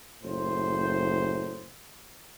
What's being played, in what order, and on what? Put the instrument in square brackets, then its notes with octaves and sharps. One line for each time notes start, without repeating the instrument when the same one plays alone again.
[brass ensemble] F#1 A2 C5